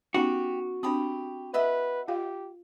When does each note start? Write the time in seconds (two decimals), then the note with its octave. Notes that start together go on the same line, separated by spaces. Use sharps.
0.14 B3 C#4 D#4 F#4 G4
0.83 C4 D4 G4 B5 D#6
1.54 B4 D#5 E5 F#5
2.08 F4 G4 F5